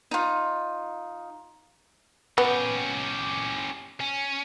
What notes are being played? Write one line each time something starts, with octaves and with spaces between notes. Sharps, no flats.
D#4 F4
B3 C#4 G4
C#4